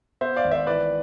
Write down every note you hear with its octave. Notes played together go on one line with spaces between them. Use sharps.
B3 C5 E5
D5 F5
G#1
C5 E5
E3 B4 D5